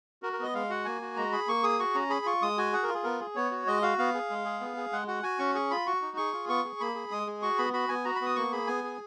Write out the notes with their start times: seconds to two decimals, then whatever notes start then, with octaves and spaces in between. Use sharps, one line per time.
0.23 F#4 A#4
0.33 A#4
0.39 B3 D#5
0.54 G#3 F5
0.70 F#4 F#5
0.85 A#3 G#5
1.02 F#4
1.16 G#3 A#5
1.32 G#4 B5
1.47 A#3 C#6
1.63 G#4 D#6
1.80 F#4 C#6
1.94 C#4 A#5
2.10 G#4 B5
2.26 F4 C#6
2.42 G#3 D#6
2.58 F#4 G#5
2.73 G#4 F#5
2.83 A#4
2.88 F4
2.94 G#4
3.04 B3 A#4
3.21 G#4
3.35 B3 C#5
3.51 F#4
3.67 G#3 D#5
3.82 F#4 F5
3.98 B3 F5
4.14 G#4
4.30 G#3
4.45 G#4
4.60 B3
4.77 G#4
4.92 G#3 F#5
5.08 F#4 F#5
5.23 F#4 G#5
5.39 C#4 C#6
5.54 G#4 C#6
5.71 F4 B5
5.86 F#4 C#6
6.02 D#4
6.17 G#4 C#6
6.33 F4
6.48 B3 C#6
6.65 G#4
6.80 A#3 B5
6.95 G#4
7.11 G#3 D#6
7.27 G#4
7.42 F#4 C#6
7.58 B3 B5
7.73 F#4 B5
7.89 B3 G#5
8.05 F#4 A#5
8.15 B5
8.21 B3 D#6
8.36 A#3 C#6
8.52 G#4 B5
8.67 B3 G#5
8.84 G#4